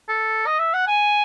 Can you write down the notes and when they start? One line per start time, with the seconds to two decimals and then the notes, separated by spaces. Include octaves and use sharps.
0.09 A4
0.46 D#5
0.59 E5
0.74 F#5
0.87 G#5